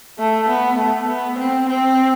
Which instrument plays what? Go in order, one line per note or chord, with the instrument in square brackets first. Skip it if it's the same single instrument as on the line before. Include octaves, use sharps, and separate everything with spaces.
[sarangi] A3
B3
A3
B3
C4
C4